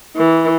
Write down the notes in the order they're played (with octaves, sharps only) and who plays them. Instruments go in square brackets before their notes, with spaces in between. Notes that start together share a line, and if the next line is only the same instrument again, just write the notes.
[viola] E3